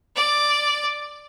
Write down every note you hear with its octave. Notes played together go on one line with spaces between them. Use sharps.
D5